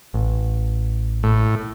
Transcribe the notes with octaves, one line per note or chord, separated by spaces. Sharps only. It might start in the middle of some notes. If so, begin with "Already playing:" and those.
A1
A2